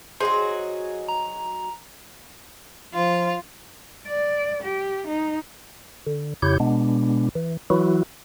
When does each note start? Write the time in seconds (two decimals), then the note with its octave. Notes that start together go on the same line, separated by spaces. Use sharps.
0.20 F#3 D#4 F#4 G#4 C5 C6
1.09 A#5
2.94 F3 F4
4.07 D5
4.63 G4
5.08 D#4
6.07 D3
6.42 F2 C#3 E4 G4 C#5 G6
6.60 B2 G#3 B3 D4
7.35 E3
7.70 E3 F#3 E4 F#4